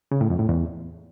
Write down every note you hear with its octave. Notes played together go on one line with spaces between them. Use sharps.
C#3
A2
F2
A2
E2